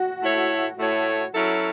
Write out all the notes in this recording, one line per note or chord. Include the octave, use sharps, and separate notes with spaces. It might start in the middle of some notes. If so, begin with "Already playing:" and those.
Already playing: F#4
A2 A3 E4 C#5
A2 A3 E4 C#5
F#3 C#4 E4 A4